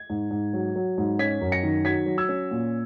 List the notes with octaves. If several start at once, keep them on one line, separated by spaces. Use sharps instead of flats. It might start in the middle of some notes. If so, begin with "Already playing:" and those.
Already playing: G#6
G#2
G#2
F#3
F#3
G#2
C#4 G#6 B6
F#2
A#6 C#7
D#3
F#3 G#6 B6
F#3
E6 G#6
C#4
A#2